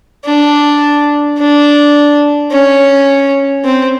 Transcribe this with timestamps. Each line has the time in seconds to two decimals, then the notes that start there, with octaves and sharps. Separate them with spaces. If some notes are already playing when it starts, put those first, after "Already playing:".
0.25 D4
1.38 D4
2.51 C#4
3.65 C4